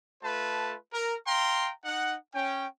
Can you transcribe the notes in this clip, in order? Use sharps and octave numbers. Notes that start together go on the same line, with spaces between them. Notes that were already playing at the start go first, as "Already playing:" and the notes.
A3 F4 B4 A5
A#4
F5 G5 A#5 C6
D#4 F#5
C#4 G5